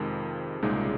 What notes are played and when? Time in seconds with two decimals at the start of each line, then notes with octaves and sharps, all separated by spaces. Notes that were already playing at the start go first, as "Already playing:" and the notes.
Already playing: F2 C3 D#3 F3 G#3
0.62 C2 A#2 C#3 G#3 D#4